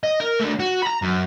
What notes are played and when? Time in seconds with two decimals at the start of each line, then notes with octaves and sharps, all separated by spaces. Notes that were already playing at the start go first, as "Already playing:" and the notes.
0.03 D#5
0.20 A#4
0.40 A3 D4
0.60 F#4
0.82 A#5 B5
1.02 F#2